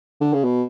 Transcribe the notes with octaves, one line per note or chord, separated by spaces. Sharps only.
D3
C#3
B2